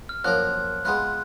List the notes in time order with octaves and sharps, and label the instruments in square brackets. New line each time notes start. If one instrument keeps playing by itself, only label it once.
[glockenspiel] F6
[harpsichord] F#2 F3 A#3 F4 A#4 [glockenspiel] F#6
[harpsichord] G#3 B3 F4 B4 [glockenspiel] F#6